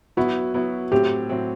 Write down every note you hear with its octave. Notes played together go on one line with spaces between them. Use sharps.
F#3 B3 E4 F#4
F#3 B3 E4
A2 F#3 C4 G4
A2 F#3 C4